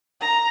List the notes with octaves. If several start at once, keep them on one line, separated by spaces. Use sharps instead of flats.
A#5